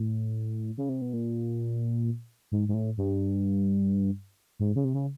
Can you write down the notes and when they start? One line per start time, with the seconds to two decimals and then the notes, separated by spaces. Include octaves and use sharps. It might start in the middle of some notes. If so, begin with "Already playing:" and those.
Already playing: A2
0.78 C#3
0.89 C3
1.02 B2
1.13 A#2
2.52 G#2
2.68 G#2
2.74 A2
2.98 G2
4.60 G#2
4.76 C#3
4.84 C3
4.94 C#3